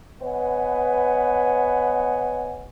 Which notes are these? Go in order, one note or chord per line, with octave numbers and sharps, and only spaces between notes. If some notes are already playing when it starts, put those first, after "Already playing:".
B3 B4 C#5 D#5 F#5 G#5